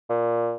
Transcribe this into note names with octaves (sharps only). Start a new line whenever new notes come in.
A#2